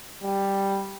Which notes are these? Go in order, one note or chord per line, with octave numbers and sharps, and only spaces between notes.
G3